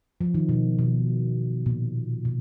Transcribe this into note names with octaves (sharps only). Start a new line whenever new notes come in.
F3
D#3
B2
B2
A#2
B2